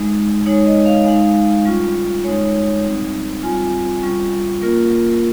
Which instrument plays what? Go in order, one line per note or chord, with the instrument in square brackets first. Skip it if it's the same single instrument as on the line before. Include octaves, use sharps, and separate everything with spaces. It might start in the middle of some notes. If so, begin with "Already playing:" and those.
Already playing: [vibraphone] G#3 D#4
G#3 D#4 C#5
D#5
F5
G#3 D#4 F5
G3 C#4 F4
G#3 D#4 C#5
G3 C4 D#4
G3 C4 F4 G#5
G3 C#4 F4
A#3 C#4 F4 A#4